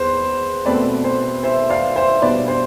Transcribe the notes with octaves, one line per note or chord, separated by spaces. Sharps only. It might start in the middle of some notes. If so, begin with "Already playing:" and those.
Already playing: E2 B4 C5
B2 A3 C4 B4 D5
C5
C5 E5
D5 F5
C5 E5
B2 G3 D4 B4 D5
C5